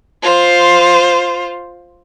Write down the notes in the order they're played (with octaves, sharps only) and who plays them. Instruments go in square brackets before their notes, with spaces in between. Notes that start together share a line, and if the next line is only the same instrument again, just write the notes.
[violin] F4 C5